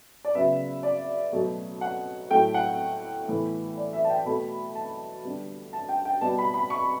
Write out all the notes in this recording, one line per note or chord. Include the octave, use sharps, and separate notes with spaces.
D5
C#3 F#3 B3 E5
D5
B2 F#3 A3
F#5
A2 F#3 A3 G5
F#5
A2 E3 B3
D5
E5
A5
G5
B2 A3 B5
A5
D3 G3 B3
A5
G5
G5
B2 G3 B3 A5
B5
B5
C#6